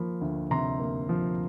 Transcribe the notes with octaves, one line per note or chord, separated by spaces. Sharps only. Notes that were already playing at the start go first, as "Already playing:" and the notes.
Already playing: F3 A#3 B5
D2
C3 A#5 C6
A#3
F3